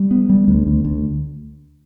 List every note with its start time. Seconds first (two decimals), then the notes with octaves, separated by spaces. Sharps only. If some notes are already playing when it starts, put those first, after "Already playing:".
Already playing: G3
0.11 B3
0.30 G3
0.48 D2
0.67 D2
0.85 D2